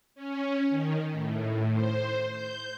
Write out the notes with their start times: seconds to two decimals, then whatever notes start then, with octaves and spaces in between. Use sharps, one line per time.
0.15 C#4
0.70 D#3
1.11 A2
1.72 C5
2.27 G6